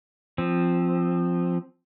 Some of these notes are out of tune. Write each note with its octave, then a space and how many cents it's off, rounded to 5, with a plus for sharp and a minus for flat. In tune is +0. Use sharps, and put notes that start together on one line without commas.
F3 +0 C4 +0